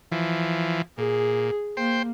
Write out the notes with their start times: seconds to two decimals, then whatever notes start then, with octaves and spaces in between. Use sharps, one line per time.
0.12 E3 F3
0.98 A#2 G#4
1.77 A#3 C5 G5